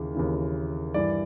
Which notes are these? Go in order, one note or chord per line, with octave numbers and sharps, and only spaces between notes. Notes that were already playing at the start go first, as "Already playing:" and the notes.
Already playing: D#2 C#3 E3
D#2 C#3 E3
G2 E3 D5